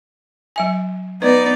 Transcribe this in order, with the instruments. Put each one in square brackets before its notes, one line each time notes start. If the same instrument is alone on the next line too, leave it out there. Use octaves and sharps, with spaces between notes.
[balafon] F#3 E5 G#5
[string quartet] B3 D#4 D5 [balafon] B4